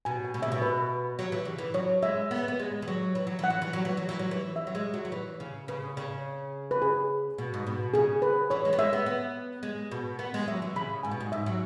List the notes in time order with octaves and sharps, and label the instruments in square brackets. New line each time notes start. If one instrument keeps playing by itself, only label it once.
[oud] B2 [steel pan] G#5
[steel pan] G#5
[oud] B2
[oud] C#3 [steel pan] E5
[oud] B2
[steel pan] B4
[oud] F#3
E3
C#3
E3
[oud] F#3 [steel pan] C#5
[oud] G#3 [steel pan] E5
[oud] B3
B3
G#3
E3
F#3
E3
F#3
[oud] E3 [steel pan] F#5
[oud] F#3
E3
F#3
E3
F#3
E3
F#3
E3
[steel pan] E5
[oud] F#3
G#3
F#3
F#3
E3
C#3
[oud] C#3 [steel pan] B4
[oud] C#3
[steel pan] B4
G#4
[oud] B2
G#2
B2
[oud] C#3 [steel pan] G#4
[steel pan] B4
[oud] E3 [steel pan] C#5
[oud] G#3
B3
[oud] G#3 [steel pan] E5
[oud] B3
B3
G#3
B2
[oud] B3 [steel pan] F#5
[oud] G#3
[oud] F#3 [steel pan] E5
[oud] E3
[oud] C#3 [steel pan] B5
[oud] G#2 [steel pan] G#5
[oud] B2
G#2
[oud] G#2 [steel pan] E5
[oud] F#3